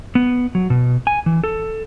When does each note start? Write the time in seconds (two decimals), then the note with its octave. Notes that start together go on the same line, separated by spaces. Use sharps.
0.15 B3
0.55 F#3
0.70 B2
1.07 G#5
1.26 E3
1.44 A4